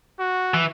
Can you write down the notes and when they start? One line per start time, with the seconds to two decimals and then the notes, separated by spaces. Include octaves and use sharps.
0.20 F#4
0.54 E3